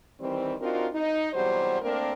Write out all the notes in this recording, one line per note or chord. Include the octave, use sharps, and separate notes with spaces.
D#3 E3 G3 C4
C4 D4 D#4 F4 F#4 A#4
D#4
E2 C3 F#3 G3 C5
A3 A#3 C4 D4 A#4